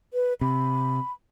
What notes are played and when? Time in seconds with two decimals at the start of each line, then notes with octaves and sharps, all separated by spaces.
0.14 B4
0.41 C3 B5